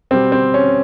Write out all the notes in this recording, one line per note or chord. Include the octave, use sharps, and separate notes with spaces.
B2 G3 C4
C4
C#4